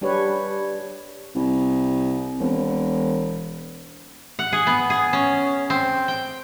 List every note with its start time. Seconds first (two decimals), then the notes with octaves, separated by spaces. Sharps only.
0.01 G3 D4 G4 B4 C#5
1.35 C2
2.40 E1
4.39 F#5
4.53 G#4
4.67 B3
4.90 G#4
5.13 C#4
5.70 C4
6.08 G5